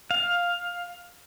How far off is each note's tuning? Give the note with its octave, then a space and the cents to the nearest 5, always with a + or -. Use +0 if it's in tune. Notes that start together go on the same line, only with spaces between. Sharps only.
F5 +10